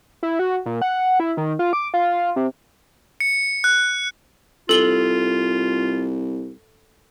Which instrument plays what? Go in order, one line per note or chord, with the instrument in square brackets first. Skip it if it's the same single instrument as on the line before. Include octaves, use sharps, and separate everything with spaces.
[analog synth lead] E4
F#4
A#2
F#5
E4
D#3
F4
D6
F4
C3
[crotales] C#7
F#6
[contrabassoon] C2 [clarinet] F4 [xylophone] A4 F#7 G7